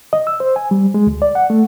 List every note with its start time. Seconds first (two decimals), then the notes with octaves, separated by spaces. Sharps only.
0.13 D#5
0.27 E6
0.40 C5
0.56 G#5
0.71 G3
0.94 G#3
1.07 D2
1.22 D5
1.35 F#5
1.50 A3